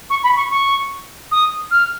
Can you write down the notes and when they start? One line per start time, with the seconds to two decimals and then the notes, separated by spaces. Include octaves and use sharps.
0.10 C#6
0.24 B5
0.37 C#6
0.51 C#6
1.32 D#6
1.71 F6